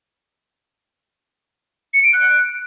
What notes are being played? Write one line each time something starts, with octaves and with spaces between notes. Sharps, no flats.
C#7
D7
F#6